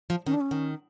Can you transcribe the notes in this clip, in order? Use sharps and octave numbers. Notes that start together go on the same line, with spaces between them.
F3
D#3 C#4
D4
C#4
D#3